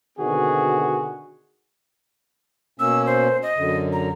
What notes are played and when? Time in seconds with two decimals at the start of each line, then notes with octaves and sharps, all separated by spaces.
0.18 B2 D3 D#3 C4 F#4 G#4
2.80 B2 A#3 C#4 E6
3.06 C5
3.43 D#5
3.56 F#2 D3
3.93 A#5